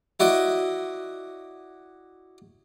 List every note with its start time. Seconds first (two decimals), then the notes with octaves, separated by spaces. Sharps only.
0.20 E4 F#4 D5 D#5